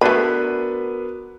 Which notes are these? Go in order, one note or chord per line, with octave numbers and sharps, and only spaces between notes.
A3 B3 D4 F#4 A#4 B4 B5